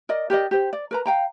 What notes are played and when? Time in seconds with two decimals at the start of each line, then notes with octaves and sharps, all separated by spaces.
0.09 A#4 D5 D#5
0.30 G4 A#4 D5 D#5
0.51 G4 C5
0.73 D5
0.91 A#4 B4 A#5
1.06 F5 G5 A#5